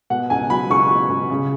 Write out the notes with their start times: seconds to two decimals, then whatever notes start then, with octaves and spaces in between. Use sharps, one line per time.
0.10 B2 F#5
0.30 C#2 G#5
0.50 F#3 B5
0.70 C#2 C#6
0.89 B2
1.09 C#2
1.30 C#3